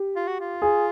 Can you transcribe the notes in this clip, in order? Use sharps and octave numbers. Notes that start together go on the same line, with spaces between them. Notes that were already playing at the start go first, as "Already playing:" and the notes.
Already playing: G4
F4
F#4
F4
G#4